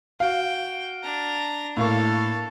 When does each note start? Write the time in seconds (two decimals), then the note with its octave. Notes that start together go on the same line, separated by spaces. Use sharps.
0.20 F#4 F5 G5
1.03 D4 A#5
1.77 A2 A#3 A4 F5 C#6